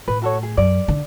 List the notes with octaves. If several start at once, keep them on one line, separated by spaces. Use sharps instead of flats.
A2 B4
F#4 A4 C#5
G#4
F#2 D5
D3